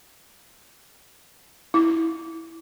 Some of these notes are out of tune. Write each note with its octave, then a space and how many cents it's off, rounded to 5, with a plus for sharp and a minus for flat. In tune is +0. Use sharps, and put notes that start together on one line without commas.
E4 -5